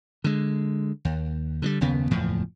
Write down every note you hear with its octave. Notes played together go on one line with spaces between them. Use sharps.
D3 G#3
D#2
D3 F3 G3
F#1 D#2 C#3 B3
F#1 E2 A2 F3